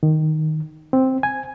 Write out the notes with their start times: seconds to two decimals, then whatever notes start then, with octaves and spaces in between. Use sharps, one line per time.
0.03 D#3
0.93 C4
1.23 G#5